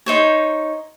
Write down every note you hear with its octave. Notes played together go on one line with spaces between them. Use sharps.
D#4 C5 C#5